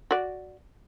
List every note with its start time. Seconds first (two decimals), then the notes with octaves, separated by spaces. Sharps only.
0.11 F#4 D5